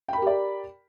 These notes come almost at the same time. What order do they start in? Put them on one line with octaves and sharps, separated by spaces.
G5 B5 A#4 G4 D5